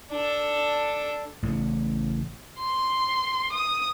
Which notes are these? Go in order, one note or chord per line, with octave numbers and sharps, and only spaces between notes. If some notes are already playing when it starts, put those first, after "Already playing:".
D4 A4
A1 A2 C#3
C6
D#6